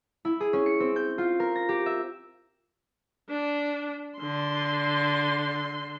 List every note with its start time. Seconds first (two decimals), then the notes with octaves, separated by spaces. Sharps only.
0.25 E4
0.40 G#4
0.53 C#4
0.66 C#7
0.80 C4
0.96 G6
1.18 F4
1.40 A#4
1.56 A#6
1.69 G4
1.86 E5
3.29 D4
4.18 D3 C6